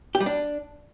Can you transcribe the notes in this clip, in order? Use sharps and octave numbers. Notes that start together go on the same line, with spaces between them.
G4
G3
D4